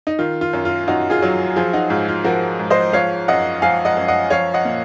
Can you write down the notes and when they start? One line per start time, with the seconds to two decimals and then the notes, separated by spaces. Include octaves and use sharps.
0.07 D#4
0.19 D#3 F4
0.41 F4
0.53 F#2
0.65 F4
0.88 F#2 D#4 F#4
1.10 F4 G#4
1.22 F#3
1.56 F3 F4 G#4
1.73 D#4 F#4
1.90 G#2 F4
2.08 F4
2.24 F3 F#4 A#4
2.59 G#2
2.70 C5 D#5
2.93 F3 C#5 F5
3.28 F#2 D#5 F#5
3.62 F3 F5 G#5
3.85 D#5 F#5
3.97 F#2
4.08 D#5 F#5
4.30 F3 C#5 F5
4.54 D#5 F#5
4.65 A#2